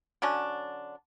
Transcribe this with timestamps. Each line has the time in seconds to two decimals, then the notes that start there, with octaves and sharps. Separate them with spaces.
0.22 D3 F#3 C#4 D4